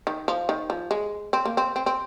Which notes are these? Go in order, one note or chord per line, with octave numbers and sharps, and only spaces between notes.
D#3
F3
D#3
F3
G#3
C4
A#3
C4
C4
C4